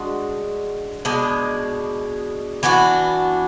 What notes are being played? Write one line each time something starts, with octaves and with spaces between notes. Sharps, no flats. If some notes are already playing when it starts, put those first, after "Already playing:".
Already playing: G#3 D4 F#4
B2 G#3 D4
E3 B3 D4 F#4